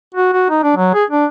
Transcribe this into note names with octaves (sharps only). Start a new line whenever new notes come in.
F#4
F#4
D#4
D4
F#3
G#4
D4